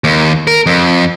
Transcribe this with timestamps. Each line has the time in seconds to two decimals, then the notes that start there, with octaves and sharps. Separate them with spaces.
0.04 D#2
0.47 A#4
0.66 F2